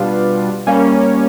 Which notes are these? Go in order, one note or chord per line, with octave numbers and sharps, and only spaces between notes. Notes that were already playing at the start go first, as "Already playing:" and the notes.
Already playing: B2 G3 B3 D4 F4
G3 A#3 C#4